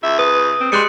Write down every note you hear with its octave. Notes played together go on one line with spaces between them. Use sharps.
C#2 E5
B4 D#6
C4
G3 G#3 C6 F#6 C#7